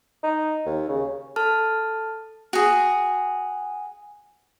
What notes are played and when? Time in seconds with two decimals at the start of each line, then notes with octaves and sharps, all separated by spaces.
0.23 D#4
0.66 D#2
0.89 C#3
1.36 A4 A5 F6
2.53 F#4 G#4